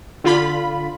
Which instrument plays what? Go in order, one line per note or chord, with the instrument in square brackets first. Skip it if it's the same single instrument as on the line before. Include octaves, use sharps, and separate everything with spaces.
[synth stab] D3 F4 B5